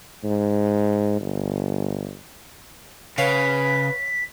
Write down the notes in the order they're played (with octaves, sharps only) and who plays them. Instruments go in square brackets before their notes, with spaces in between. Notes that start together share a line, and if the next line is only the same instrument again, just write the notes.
[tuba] G#2
G1
[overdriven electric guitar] C#3 [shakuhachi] B4 [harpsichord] C#5 F5 F#5 [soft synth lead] B6